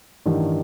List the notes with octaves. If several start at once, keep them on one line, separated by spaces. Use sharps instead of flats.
A1 G2 D#3 G3